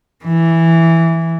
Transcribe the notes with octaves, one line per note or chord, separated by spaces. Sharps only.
E3